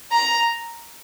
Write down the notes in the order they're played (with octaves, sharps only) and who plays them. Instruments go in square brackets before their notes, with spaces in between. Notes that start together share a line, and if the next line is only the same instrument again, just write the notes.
[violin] A#5